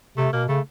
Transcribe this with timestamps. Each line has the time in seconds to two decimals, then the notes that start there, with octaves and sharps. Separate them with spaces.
0.18 C3 A3
0.33 B2 A#3
0.49 C#3 A3